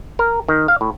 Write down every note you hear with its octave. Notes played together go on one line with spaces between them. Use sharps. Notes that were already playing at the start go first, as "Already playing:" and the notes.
A#4
D#3
F5
A2